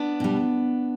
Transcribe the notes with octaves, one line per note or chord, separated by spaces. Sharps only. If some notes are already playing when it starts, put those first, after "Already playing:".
Already playing: B3 D4
B2 G3